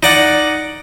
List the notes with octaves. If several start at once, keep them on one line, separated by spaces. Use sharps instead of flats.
D#4 D5 F#5